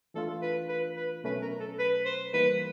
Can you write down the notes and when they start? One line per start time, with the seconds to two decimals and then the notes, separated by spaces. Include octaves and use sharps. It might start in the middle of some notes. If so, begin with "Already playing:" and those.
0.14 E3 A3 D4 F4 A4
0.42 B4
0.69 B4
0.97 B4
1.24 B2 F#3 A3 C#4 B4
1.42 A#4
1.60 A4
1.79 B4
2.05 C5
2.33 E3 G3 A#3 D#4 B4